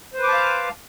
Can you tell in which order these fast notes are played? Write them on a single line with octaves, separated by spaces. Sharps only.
C5 B4 D6 A5 F5